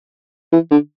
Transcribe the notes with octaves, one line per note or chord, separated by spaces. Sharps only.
E3
D3